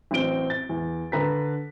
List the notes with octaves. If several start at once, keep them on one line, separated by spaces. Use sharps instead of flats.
A1 F#3 C4 D7 G7
A6
E2
D3 B4 A#5 B6